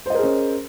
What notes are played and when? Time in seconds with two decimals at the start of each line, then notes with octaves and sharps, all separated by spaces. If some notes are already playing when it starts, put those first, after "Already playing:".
0.06 C5
0.10 D#5
0.15 A#4
0.19 G#4
0.23 C#4